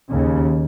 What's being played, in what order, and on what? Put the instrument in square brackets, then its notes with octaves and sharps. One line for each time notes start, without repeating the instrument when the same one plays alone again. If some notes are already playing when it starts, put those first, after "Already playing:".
[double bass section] D#2 C#3